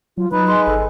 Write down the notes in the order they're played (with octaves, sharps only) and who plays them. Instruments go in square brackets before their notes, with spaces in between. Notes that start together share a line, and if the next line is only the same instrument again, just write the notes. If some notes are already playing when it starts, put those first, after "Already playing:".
[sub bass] F#3 [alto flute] F4
[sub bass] F#3 [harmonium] D#4 B4 [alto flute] B5
[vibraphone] G#4 D#5 G#5 [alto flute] C6
[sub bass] G1 [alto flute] A4